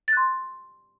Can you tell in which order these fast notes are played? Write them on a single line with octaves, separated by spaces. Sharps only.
A6 F#6 C6